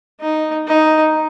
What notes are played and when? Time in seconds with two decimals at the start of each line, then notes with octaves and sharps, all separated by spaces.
0.21 D#4
0.67 D#4